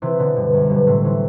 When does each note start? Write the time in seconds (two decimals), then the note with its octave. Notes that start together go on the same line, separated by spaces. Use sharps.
0.02 C3 E3
0.19 B2 D3
0.36 G2
0.53 F#2
0.70 G2
0.87 A2 C3
1.04 C3 E3